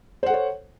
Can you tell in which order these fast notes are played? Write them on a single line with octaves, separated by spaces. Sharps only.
C5 F#5 A4 C#5